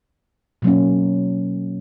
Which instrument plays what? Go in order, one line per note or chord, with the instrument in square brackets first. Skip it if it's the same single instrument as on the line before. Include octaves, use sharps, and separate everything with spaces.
[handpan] B2 F#3 A#3 C#4